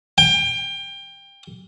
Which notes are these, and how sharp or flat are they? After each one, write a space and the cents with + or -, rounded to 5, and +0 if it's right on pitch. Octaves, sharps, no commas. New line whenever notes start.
G5 +25